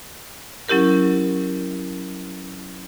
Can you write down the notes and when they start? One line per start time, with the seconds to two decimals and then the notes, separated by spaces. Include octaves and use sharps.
0.69 F#3 C#4 E4 G4 A#4